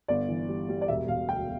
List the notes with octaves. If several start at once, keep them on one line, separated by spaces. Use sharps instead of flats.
G1 D5
E3
G3
G3
D5
E1 E5
E1 F5
D2 G5